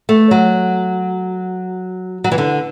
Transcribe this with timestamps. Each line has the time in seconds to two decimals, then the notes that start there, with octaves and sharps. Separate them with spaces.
0.09 A3
0.31 F#3
2.24 F#3
2.32 E3
2.38 D3